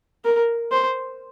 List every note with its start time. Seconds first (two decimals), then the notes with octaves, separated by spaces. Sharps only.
0.25 A#4
0.72 C5